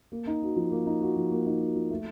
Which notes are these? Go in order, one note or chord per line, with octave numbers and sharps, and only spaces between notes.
A#3
D#4
F#4
F3
A#3
D#4
F#4
F3
A#3
D#4
F#4
F3
A3